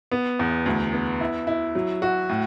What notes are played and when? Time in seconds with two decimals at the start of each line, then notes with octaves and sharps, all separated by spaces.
0.12 B3
0.39 E2
0.66 D2
0.93 B3
1.20 E4
1.47 E4
1.75 F#3
2.02 F#4
2.29 A2